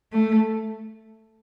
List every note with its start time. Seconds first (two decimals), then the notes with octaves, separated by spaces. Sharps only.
0.13 A3